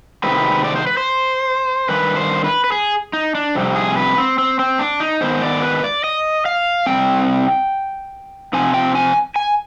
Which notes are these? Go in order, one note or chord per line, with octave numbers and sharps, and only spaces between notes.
C3 D#3 G#3 C4 B4
D5
C5
B4
C5
G2 D#3 B4
C5
B4
B4
G#4
D#4
D4
F2 C3 G3 C4
G#4
B4
C4
C4
C4
D4
D#4
G#2 D#3 B3 C5
D5
B4
D5
D#5
F5
C3 D#3 G3 C4 G5
C3 F3 C4 G#5
G5
G#5
G#5